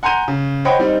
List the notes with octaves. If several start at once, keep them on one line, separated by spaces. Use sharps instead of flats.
F#5 G#5 A#5 C6 G6 D#7
C#3
C5 C#5 D#5 F#5 G5 B5
G3 C4 D#4